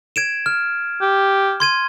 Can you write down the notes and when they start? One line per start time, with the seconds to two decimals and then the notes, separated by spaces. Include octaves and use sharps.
0.16 G#6 D7 E7
0.46 F6
1.01 G4
1.60 C6 G#6 D#7